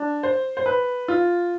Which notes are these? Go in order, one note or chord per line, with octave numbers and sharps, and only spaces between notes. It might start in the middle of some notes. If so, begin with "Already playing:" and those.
Already playing: D4
C5
C5
B4
F4